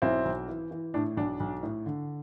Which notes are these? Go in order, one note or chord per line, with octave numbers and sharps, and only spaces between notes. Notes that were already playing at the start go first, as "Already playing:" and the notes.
B1 C4 E4
B1
E3
E3
A2 D4
B1 D4
B1
A2
D3